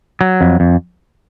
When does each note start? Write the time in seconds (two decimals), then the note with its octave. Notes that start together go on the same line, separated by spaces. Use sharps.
0.21 F#3
0.41 F2
0.60 F2